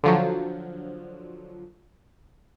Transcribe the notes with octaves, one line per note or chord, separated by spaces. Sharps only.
D3 F3 F#3